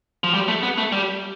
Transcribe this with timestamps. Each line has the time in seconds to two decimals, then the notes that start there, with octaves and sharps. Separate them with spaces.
0.24 F3
0.34 G3
0.48 A3
0.63 B3
0.78 A3
0.92 G3